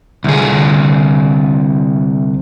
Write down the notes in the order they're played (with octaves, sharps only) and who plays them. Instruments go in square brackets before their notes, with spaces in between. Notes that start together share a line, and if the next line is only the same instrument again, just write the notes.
[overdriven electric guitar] C2 G#4 [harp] D3